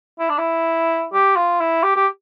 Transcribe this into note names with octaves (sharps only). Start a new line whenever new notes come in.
E4
D4
E4
G4
F4
E4
G4
G4